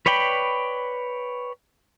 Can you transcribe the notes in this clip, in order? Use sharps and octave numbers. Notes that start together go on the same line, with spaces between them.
B4 C#5 D5 G5 B5